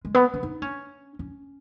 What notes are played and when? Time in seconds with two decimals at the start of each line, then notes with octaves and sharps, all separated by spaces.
0.05 G#3
0.14 B3
0.34 C#4
0.43 D#4
0.62 C#4
1.19 C#4